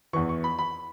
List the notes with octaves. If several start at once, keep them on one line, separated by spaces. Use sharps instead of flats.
E2 E3 C#6
C#6
B5
B5